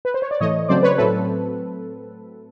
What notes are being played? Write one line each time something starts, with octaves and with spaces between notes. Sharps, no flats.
B4
C5
C#5
D5
A2 E3 A3 C#5 D#5
C#3 F#3 A3 C4 C5 D5
B4 C#5
A2 F#3 A3 C4 A4 B4